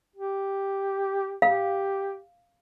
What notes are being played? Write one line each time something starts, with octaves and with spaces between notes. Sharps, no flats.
G4
G4 F5